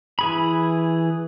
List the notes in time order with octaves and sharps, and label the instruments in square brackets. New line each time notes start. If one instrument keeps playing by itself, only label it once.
[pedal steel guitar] E3 G#4 B5